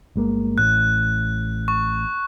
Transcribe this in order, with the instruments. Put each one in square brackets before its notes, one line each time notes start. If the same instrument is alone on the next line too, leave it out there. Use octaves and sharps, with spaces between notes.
[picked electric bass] G1 G#3 A#3
[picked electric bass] A1 A2 [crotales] F#6
[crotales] C#6